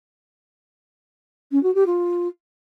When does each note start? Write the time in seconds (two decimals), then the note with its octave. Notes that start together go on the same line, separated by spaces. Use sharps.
1.51 C#4
1.63 F#4
1.75 G4
1.86 F4